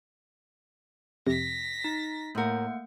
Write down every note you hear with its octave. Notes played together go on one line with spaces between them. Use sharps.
F2 C3 A#6 B6
D#4
A2 A3 A#3 A#4 F#5